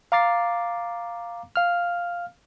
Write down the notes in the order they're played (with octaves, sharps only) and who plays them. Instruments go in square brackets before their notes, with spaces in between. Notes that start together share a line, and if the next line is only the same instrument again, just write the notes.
[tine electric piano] F5 A#5 D6 A6 C7
F5 F6